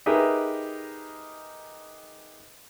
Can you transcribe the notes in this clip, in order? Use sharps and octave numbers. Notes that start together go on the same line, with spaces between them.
D#4 G4 G#4 A#4 B4 E5